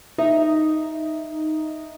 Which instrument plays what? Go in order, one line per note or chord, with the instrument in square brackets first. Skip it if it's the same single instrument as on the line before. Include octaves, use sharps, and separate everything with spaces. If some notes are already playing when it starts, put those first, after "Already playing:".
[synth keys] D#4 [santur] E5